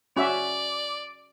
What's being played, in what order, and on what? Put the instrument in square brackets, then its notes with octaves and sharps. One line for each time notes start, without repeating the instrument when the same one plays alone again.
[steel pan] C#4 F#4 E5 [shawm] D5